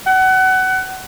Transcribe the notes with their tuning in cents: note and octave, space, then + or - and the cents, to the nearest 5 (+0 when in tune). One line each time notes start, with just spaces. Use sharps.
F#5 +25